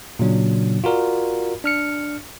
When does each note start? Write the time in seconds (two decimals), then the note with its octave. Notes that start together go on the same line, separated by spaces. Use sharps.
0.19 A#2 C#3 F#3 D4
0.84 F4 F#4 A#4 D5
1.64 D4 F6 C#7